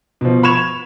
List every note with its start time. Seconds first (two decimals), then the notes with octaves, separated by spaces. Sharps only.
0.21 B2 F3
0.43 B5 C#6 G#6 E7 F7